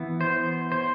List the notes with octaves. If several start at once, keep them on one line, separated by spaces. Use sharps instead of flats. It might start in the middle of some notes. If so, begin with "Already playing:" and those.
Already playing: E3 B3
C5
C5